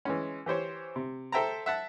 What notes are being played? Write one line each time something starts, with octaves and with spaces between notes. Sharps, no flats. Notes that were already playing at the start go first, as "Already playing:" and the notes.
E3 G#3 C#4
E3 G4 C5 C#5
C3
A4 C5 E5 G5 A5 A#5
E5 F#5 A5